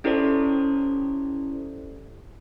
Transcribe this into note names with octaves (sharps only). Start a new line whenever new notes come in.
C#4 E4 G4 A4 C5 D5